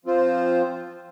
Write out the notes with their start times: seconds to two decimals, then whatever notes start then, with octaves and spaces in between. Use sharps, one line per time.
0.05 F3 C4 F4 C5